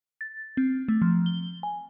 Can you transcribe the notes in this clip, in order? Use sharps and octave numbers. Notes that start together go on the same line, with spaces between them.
A6
C4
A3
F3
G7
G#5